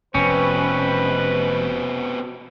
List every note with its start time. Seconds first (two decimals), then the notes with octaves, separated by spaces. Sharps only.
0.15 F1 B2 C4 C#4 B4